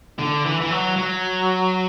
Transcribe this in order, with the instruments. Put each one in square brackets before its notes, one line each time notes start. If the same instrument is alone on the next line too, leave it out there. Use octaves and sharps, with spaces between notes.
[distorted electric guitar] D3
E3
E3
F#3
F#3